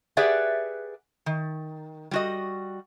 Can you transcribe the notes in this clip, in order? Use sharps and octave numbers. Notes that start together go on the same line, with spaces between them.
G4 G#4 B4 D5 E5 F#5
D#3
G3 F#4 D#5